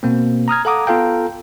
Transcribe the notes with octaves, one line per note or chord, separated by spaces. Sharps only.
B2 A#3 C4
A#5 D#6 F6 G#6
A4 F5 F#5 A#5 D6 D#6
B3 F4 A4 F5 G5 A#5